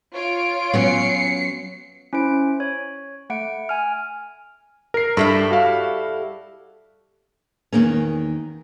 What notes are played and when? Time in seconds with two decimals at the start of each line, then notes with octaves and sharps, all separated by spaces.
0.14 F4 C#5 D7
0.73 F#3 B3 C#4 C7 C#7
2.13 C#4 E4 C5 D7
2.60 C#5
3.30 A3 F#5 D7
3.69 G#5 F6
4.94 A#4 C7
5.17 G2 G3 E4 A4
5.51 F#4 F5
7.72 E2 G2 D#3 A#3 C#4